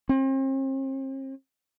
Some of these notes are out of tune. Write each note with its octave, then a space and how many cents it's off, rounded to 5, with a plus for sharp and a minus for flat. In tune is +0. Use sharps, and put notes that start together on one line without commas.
C4 +40